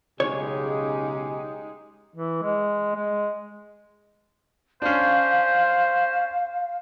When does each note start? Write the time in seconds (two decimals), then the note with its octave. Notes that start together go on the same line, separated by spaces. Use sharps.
0.20 B1 C#3 G#3 D#4 G4 G#4 C#5
2.14 E3
2.42 G#3
2.95 G#3
4.82 C#4 D4 C5 F5